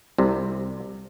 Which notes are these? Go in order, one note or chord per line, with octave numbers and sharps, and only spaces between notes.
C2 C3